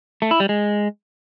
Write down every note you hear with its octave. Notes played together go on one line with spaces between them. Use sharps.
A3
E4
G3
G#3